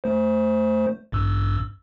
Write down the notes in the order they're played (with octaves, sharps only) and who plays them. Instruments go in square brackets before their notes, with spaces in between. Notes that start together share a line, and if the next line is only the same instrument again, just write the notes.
[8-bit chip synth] A3 C5
A1 G2 E6